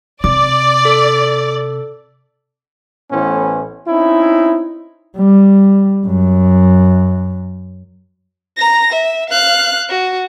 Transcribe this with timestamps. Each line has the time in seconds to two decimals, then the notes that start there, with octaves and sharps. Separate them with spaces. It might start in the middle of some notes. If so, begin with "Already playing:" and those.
0.24 C3 D5 D6
0.85 A4
3.11 A1 A2 E3 B3 C#4 C5
3.88 C4 C#4 D#4 E4
5.17 G3
6.06 F#2
8.57 A#5 A#6
8.93 E5
9.30 F5 F#6
9.89 F#4